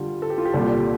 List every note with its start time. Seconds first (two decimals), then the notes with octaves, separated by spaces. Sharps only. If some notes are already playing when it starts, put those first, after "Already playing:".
Already playing: D3 G3 F4
0.22 A4
0.30 G4
0.38 F4
0.45 G4
0.54 C2 A#2 G3 A4